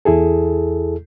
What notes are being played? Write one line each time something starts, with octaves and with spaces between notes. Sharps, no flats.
E2 E4 G#4 A4